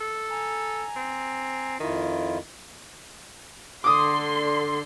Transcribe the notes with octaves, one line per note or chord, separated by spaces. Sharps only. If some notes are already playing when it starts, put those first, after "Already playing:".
A4
G#5 A#5
C4
F2 D#3 E4 F4
D3 C6 D6 D#6